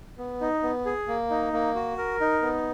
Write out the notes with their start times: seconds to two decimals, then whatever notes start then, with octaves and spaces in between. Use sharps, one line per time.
0.18 B3
0.41 D#4
0.63 B3
0.86 G#4
1.08 A#3
1.30 D#4
1.53 A#3
1.75 F#4
1.98 A#4
2.21 D#4
2.42 B3